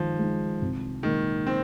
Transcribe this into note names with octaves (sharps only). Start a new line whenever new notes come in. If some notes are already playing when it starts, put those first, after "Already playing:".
Already playing: D#3 F3 G#3 D#4
G#3 D#4
C2
A#2 D#3 G#3
C4